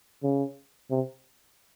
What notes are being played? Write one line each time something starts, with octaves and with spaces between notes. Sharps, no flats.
C#3
C3